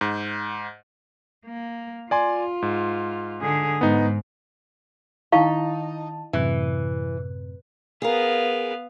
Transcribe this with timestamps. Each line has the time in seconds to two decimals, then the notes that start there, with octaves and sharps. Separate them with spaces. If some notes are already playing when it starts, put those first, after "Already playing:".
0.01 G#2
1.45 A#3
2.11 F4 D5 G#5 C6
2.62 G#2
3.41 D3 G#4
3.81 G#2 B3 D#4
5.32 D#3 D#4 E4 F5 A5 C#6
6.33 F#2 A2 C3 E3
8.02 B3 G#4 A#4 F5